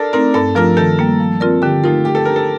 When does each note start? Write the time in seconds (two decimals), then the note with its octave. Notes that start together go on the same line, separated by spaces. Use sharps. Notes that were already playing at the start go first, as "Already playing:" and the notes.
Already playing: D4 A4 A#4
0.13 A3 C4 D#4 A#4
0.34 G2 A4
0.55 F3 A3 D4 F4 A#4
0.77 D#3 A4
0.99 G3 A#3
1.20 F3
1.40 C4 F4 A#4 D5
1.62 D3 G4
1.84 A3 D#4 F4 A#4
2.05 A3 G4
2.15 A4
2.25 D4 G4 A#4
2.36 A4